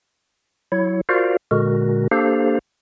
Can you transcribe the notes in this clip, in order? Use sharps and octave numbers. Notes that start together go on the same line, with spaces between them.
F#3 E4 C#5
F4 F#4 A#4 C5 D5 F5
A#2 D3 G#3 F#4 A#4
A#3 D4 G4 A4 C5 F5